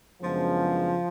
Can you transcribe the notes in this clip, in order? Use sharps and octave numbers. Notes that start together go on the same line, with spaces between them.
F#2 C#3 F3 G#3 B3 D4